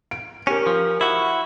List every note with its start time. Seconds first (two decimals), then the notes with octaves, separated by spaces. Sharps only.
0.11 D7
0.47 C#4 G4 A#4
0.67 F3
1.01 E4 F#4